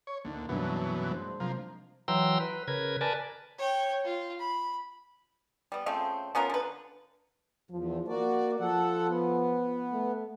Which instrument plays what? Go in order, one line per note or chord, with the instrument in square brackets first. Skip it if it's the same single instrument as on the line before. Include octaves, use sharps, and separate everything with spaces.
[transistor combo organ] C#5
[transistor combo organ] D2 [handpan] A#3 D#4
[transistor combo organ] F#2 B2 E3 [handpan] G3 D4
[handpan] G#3 D4 C5
[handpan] C3 F#3 [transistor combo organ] F3 A#3
[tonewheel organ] E3 F#3 G5 A#5 C6 E6
B4
C#3 A#4 B4 G#6
A#4 B4 D5 G#5 A5
[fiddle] C#5 G5
F4
B5
[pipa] G3 B3
C#3 F3 A3 C4
B3 C#4 F4 A#4
D3 B4
[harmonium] E2 [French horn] F3
[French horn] A#3 [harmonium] F#4 D5
[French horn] F3 [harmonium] A4 F#5
[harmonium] B3
[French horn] A3